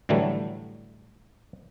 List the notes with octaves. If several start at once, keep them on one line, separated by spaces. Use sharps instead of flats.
A2 D3 E3 F#3 G3 A3